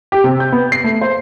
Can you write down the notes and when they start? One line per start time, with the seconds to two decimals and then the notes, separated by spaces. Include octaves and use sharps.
0.12 G4
0.24 C3
0.40 G6
0.52 B3
0.72 C7
0.84 A3
1.01 C5